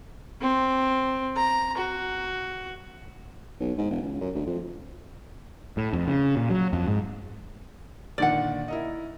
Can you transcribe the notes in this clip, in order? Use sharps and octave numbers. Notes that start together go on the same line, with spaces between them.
C4
A#5
F#4
B1
G#2
E1
C#2
F#2
D2
F2
A2
F2
C#3
A#2
F#3
F2
G#2
A#2 D3 D#3 D5 F#5
E4 A#4 D#5